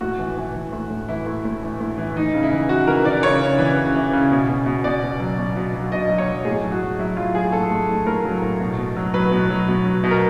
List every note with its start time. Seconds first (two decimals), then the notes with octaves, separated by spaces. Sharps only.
0.01 A2 F#4
0.19 E3
0.37 E3
0.55 E3
0.72 A2
0.91 A2
1.09 E3 E4
1.26 A2
1.45 A2
1.62 E3
1.80 A2
1.98 E3
2.16 E3 D#4
2.34 C#3
2.43 E4
2.52 E3
2.69 E3 F#4
2.87 E3 A#4
3.05 E3 D5
3.23 C#3 C#5
3.41 C#3
3.59 E3
3.77 C#3
3.95 E3
4.13 C#3
4.31 B2
4.49 B2
4.66 B2
4.84 B2 D5
5.03 B2
5.20 F#3
5.38 B2
5.56 B2
5.74 F#3
5.92 B2 D#5
6.10 F#3
6.18 C#5
6.28 F#3
6.45 A2 G#4
6.64 F#3
6.72 F#4
6.82 F#3
6.99 F#3 E4
7.17 F#3 F4
7.35 F#3 G#4
7.52 A2 A4
7.71 A2
7.89 A2
8.06 A2 A#4
8.25 F#3
8.42 A2
8.60 B2
8.78 B2
8.97 F#3
9.14 F#3 B4
9.31 B2
9.50 F#3
9.68 B2
9.85 F#3
10.04 B2
10.11 A#4